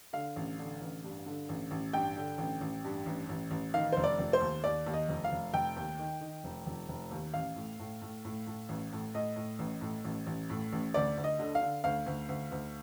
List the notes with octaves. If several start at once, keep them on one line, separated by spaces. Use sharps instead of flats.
D3 F5
A1
D3
A1
G2
D3
A1
A1
G2 G5
D3
A1
A1
G2
A1
A1
A1
D#3 F5
F1 C5
D5
F1
C5
D#2
D#2 D5
D#2
D#5
F1
F5
F1
F1 G5
D#2
D#3
D#3
F1
F1
F1
D#2
A1 F5
A2
A2
A2
A2
A2
A1
A2
A2 D#5
A2
A1
A2
A1
A1
A2
A1
D2 D5
D2
D#5
D3
F5
D3
D2 F5
D2
D2
D2